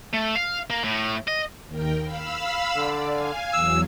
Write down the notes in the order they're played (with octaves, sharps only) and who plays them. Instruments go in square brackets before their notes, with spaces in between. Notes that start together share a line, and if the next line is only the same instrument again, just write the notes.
[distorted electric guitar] A3
F5
A#3
A2
D#5
[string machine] D#2 A#4 G5
F5 B5 E6
[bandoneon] D3 [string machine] D5
[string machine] F5 G#5
[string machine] E2 F#3 [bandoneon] E6